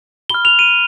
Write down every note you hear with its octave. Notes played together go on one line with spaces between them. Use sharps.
B5 F6 G7
F7
D#7